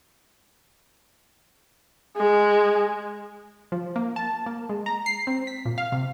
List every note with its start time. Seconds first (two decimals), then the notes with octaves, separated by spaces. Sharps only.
2.17 G#3
3.72 F3
3.96 A#3
4.16 A5
4.46 A#3
4.69 G#3
4.86 A#5
5.06 C7
5.27 C4
5.47 B6
5.65 A#2
5.78 F5
5.92 C3